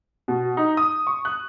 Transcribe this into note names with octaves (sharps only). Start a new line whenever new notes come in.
B2
D#4
D#6
C#6
F#6